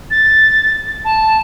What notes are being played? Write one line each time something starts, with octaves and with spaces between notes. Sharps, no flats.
A6
A5